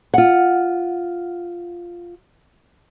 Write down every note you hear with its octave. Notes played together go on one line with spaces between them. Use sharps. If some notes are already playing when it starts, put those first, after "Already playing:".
F4 F#5